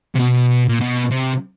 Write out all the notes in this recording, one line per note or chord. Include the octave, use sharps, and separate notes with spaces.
C3
B2
A#2
B2
C3